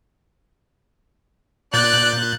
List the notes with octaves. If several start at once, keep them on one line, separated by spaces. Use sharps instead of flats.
A#2 D5 F#6 G6 A6